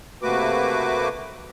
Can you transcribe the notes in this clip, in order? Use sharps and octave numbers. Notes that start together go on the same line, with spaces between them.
C3 A3 A#3 F#4 B4 D6